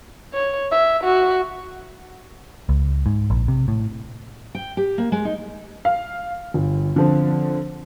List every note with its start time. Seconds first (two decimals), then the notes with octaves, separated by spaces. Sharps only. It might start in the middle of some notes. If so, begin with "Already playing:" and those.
0.34 C#5
0.71 E5
1.04 F#4
2.69 C#2
3.06 G#2
3.30 A#1
3.48 C3
3.68 A2
4.55 G5
4.77 G4
4.98 A#3
5.12 G#3
5.25 D#4
5.85 F5
6.54 G1
6.96 D3 F3 C4